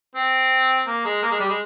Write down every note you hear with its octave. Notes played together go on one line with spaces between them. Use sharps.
C4
A#3
G#3
A#3
G#3
G3
G#3